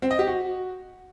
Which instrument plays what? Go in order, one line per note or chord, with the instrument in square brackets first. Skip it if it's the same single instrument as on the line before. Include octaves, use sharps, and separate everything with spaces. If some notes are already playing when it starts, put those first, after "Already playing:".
[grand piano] C4
D#5
G4
F#4